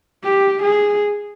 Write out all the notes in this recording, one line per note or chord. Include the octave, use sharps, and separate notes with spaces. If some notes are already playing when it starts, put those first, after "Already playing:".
G4
G#4